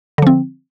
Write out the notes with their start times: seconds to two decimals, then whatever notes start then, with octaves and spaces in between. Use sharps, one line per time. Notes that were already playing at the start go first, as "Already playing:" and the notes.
0.18 D3
0.22 F3
0.27 C4